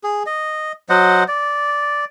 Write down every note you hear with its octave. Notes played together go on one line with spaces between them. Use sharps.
G#4
D#5
F#3 C5 D#5 F#5
D5